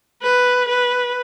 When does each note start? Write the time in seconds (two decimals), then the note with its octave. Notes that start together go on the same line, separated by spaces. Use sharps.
0.23 B4
0.69 B4